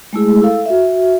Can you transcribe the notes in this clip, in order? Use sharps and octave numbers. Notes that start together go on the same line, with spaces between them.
G#3 A3 E4 G#4
E4 A4 F5
F#4 E5